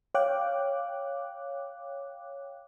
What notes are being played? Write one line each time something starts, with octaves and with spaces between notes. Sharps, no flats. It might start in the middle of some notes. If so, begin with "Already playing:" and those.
C#5 F5 G5 D6 F#6